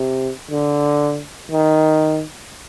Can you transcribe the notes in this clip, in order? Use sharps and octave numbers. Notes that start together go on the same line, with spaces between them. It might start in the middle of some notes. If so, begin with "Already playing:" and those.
Already playing: C3
D3
D#3